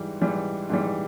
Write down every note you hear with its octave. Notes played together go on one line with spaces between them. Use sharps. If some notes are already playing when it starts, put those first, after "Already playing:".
Already playing: G#2 E3 G3
G#2 E3 G3
G#2 E3 G3